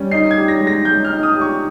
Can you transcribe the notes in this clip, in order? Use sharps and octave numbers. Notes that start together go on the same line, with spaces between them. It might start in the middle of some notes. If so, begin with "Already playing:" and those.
Already playing: G3 C#4
D#4 C7
G#6
G4
A#6
G#3
A#6
G#3 G6
F6
D#4
D#6
G4
C#6